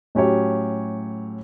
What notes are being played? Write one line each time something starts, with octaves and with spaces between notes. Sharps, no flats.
A2 F#3 C#4 G4 C#5